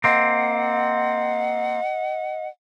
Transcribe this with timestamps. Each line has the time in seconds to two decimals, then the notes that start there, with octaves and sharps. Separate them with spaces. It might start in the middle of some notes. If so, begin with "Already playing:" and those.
0.04 A#3 C4 D#5 F#5